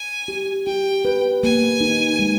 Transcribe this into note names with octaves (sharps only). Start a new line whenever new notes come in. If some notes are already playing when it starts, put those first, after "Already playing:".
Already playing: G#5
G4
G4 G5
B4
A#3 G#5
D#4
G#3